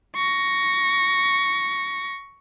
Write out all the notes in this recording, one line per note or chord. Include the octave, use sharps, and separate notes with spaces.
C#6 A#6